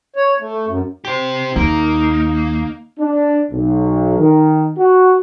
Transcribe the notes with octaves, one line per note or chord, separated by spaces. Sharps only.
C#5
A3
F#2
G4 C5
D#2 A#3 D#4
D4
B1
D#3
F#4